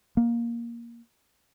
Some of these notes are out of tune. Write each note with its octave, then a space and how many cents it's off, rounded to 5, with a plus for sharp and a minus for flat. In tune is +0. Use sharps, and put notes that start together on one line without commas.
A#3 +10